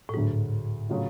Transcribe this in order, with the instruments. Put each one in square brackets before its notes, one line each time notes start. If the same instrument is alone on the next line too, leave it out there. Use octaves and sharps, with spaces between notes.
[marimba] A2
[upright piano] D2 D3 F#3 [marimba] G#2
[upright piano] C#3 F#3 A3 F4